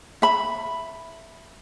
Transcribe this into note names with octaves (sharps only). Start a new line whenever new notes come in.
E5 B5